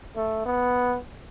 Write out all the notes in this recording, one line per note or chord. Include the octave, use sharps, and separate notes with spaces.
A3
B3